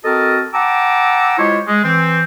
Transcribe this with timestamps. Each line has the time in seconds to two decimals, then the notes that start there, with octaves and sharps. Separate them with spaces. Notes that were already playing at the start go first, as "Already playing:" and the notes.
0.05 C4 F#4 A4 A#4 D#5 A5
0.54 F#5 G5 A5 A#5 D6 E6
1.38 G#3 E4 F4 G4 C5 C#5
1.68 G#3
1.84 E3 C4